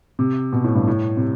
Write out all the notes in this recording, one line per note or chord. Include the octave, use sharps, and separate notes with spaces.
C3
B2
A2
G2
A2
C3